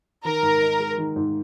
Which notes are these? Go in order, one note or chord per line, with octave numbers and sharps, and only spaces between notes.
D#3 A#4
G#2
D#4
G#3
D#3
G#2